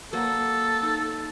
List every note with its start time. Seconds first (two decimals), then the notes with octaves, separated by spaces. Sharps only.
0.13 F#3 A#3 A4
0.83 D#4